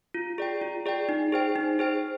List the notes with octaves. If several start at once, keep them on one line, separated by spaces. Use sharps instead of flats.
F4
G#4 D5 G5
F4
G#4 D5 G5
D#4
G#4 C5 G5
D#4
G#4 C5 G5